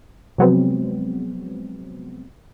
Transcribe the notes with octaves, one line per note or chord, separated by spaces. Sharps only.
C3 F3 F#3 G#3 B3 C4